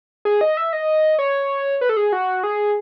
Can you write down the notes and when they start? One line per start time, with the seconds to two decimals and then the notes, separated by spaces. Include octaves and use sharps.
0.25 G#4
0.41 D#5
0.57 E5
0.73 D#5
1.19 C#5
1.81 B4
1.89 A4
1.97 G#4
2.13 F#4
2.44 G#4